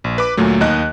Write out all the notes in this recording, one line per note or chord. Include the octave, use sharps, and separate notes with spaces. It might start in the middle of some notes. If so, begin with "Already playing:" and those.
A#1
B4 D6
D2 A#2 F#3 A3
D#2 D#4 D#5 F#6